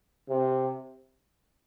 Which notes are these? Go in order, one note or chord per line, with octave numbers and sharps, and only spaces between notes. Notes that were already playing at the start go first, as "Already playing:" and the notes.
C3